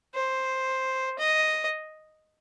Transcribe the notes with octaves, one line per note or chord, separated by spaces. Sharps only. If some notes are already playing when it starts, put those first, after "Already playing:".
C5
D#5